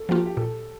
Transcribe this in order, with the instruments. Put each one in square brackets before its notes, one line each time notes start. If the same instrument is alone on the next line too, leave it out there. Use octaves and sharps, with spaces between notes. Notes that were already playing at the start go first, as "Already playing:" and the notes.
Already playing: [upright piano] A4
[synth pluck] F3 A#3 F4 [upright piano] G4
[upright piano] G4
[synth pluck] A#2 [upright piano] A4